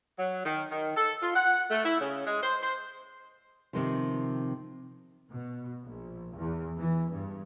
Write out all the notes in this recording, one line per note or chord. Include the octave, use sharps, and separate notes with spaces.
F#3
D#3
D#3
A4
F4
F#5
A3
E4
C#3
G#3
C5
C5
C3 D#3 F3
B2
A#1
E2
E3
G2